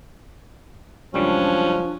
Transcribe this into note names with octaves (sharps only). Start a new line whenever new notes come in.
C#2 F#2 F3 G3 C#4 D4